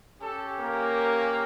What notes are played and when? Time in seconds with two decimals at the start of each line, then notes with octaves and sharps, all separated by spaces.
0.21 C#4 G4 A4
0.59 A#3 A#4